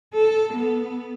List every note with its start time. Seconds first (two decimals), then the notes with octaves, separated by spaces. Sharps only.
0.14 A4
0.53 B3